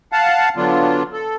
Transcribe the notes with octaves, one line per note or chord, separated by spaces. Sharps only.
F5 F#5 A5
D3 F#3 B3 D4 F4
A4